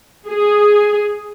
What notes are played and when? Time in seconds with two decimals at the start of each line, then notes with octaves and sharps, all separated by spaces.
0.28 G#4